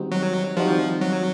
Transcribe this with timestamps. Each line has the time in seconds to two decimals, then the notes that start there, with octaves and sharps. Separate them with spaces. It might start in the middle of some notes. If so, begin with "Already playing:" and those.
Already playing: D#3 G3 C4 D#4 F#4
0.12 F#3
0.57 D#3 F3 G3 C4 D#4 F#4
1.01 F#3